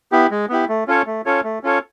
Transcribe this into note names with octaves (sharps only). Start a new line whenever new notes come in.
B3 E4 G4
G#3
B3 E4 G4
A3
C#4 F4 A4 C#5
A3
C#4 F4 A4 C#5
A3
C#4 F4 A4 C#5